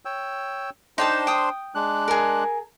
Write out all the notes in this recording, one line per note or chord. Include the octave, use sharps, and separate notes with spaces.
C#5 G5 E6
D4 D#4 C5 G5 A5 C6
G5 D#6
G#3 D4 F#6
G#4 A#4